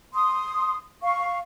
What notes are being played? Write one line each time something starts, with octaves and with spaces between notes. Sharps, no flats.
C6 D#6
F5 C#6